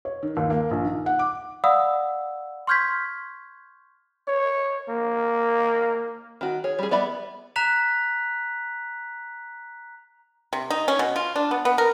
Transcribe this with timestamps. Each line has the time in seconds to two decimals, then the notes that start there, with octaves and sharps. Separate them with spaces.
0.05 C#5
0.23 D#3
0.37 D#2
0.50 A#3
0.71 A#1
0.84 D#3
1.06 F#5
1.19 D6
1.64 D5 F5 F#5 B5 D#6 E6
2.67 C6 C#6 F6 G6 G#6 B6
4.28 C#5
4.89 A#3
6.41 D#3 F#4
6.64 G#4 C#5
6.79 G3 G#4
6.91 B3 D5 E5 B5
7.56 A#5 F#6 B6 F7
10.53 C3
10.70 D#4
10.88 C#4
10.99 B2
11.16 F4
11.36 D4
11.51 B3
11.65 B3
11.78 A#4